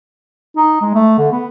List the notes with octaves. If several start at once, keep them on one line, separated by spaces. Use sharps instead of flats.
D#4
G#3
A3
D3
B3